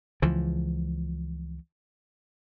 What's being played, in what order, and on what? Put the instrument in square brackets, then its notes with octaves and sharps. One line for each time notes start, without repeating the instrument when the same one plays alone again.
[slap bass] C#2 E3 F3